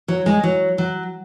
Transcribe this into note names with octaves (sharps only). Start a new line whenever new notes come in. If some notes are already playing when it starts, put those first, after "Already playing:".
F#3
G#3
F#3
F#3